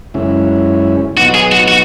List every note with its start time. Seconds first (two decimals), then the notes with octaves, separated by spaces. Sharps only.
0.14 F#2 C#3 G#3 C#4 E4
1.17 B2 F#3 B3 D#4 F#4
1.34 G#4
1.52 F#4
1.68 F#4